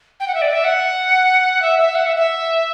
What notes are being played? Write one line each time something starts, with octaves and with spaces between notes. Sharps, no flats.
G5
F#5
E5
D5
E5
F#5
E5
E5
F#5
E5
E5